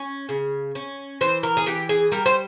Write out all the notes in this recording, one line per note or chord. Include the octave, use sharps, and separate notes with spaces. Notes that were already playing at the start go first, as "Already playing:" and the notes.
Already playing: C#4
C#3
C#4
E3 C5
A#4
G#4
E3 G4
G#4
G3 A#4
C5